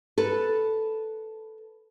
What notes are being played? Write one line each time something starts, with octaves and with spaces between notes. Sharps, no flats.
A4 B4